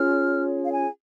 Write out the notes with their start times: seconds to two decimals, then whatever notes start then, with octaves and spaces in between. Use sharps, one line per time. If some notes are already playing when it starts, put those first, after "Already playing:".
Already playing: C#4 F4 G#4 C#5 F6
0.65 F5
0.73 G#5